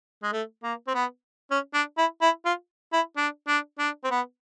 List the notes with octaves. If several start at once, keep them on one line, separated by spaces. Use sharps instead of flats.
G#3
A3
A#3
C4
B3
C#4
D4
E4
E4
F4
E4
D4
D4
D4
C4
B3